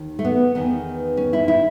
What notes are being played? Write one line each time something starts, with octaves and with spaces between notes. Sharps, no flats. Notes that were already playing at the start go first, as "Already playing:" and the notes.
Already playing: D#2 D#3
A3
B3
E2 D#3 B3
C#4
E4
E4